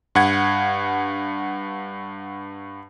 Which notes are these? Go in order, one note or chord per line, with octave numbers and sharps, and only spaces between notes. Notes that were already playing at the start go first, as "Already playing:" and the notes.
G2 F#5 G#6